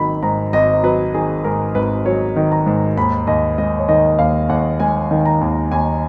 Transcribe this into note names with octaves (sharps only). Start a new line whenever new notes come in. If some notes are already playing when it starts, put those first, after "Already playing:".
Already playing: G#1 D#3 F#3 B5
G#2 A#5
G#1 D#5
F#3 B4
D#3 G#4
G#2 A#4
G#1 B4
F#3 C#5
D#3
A#5
G#2
D#2 B5
D#2 D#5
G#3 D#5
C#5
D#3 D#5
D#2 F5
D#2 F#5
G#3 G#5
D#3
A#5
D#2
D#2 G#5